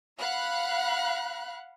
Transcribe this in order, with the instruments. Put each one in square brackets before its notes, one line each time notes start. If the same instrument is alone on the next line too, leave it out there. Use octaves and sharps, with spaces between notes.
[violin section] F5 F#5 B5 F#6